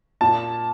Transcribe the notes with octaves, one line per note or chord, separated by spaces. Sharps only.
A#2 A5